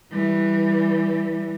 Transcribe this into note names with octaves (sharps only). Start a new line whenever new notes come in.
E3 G3